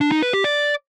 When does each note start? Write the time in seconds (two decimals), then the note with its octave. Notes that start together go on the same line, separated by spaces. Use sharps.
0.01 D4
0.12 D#4
0.23 B4
0.33 G4
0.44 D5